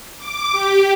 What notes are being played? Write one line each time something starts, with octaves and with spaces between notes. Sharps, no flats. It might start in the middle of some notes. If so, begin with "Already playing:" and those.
D6
G4